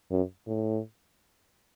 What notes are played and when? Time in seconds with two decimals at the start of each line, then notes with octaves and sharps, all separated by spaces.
0.11 F#2
0.47 A2